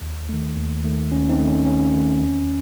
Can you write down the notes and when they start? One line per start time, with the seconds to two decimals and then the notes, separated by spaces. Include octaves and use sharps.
0.02 D#2
0.29 D#3 A3
0.57 D#2
0.84 D#3 A3
1.12 D#2 C#4
1.29 C4 D#4
1.39 D#3 A3
1.48 C#4
1.66 D#2 C#4
1.94 D#3 A3
2.22 E2